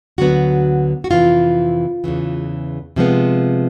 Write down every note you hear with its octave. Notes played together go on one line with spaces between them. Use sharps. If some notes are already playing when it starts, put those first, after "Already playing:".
D2 D3 F#3 B3 F#4
F#4
F2 C3 E3 F4
E2 C#3 E3
C3 F3 G#3 B3